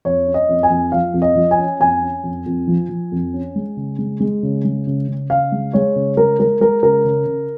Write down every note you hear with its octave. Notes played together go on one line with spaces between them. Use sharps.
F2 C#5
C#4
D#5
F2
G#5
F2
F3 F5
F2
D#5
F3
G#5
C#4
F2 G#5
C#4
F2
F2
F3
F3
F2
C#4
G#3
C#3
G#3
G#3
C#3
G#3
C#3
C#3
C#3 F5
G#3
G#3 C#5
C#3
G#3 A#4
G#3 A#4
G#3 A#4
C#3 A#4
C#3
C#3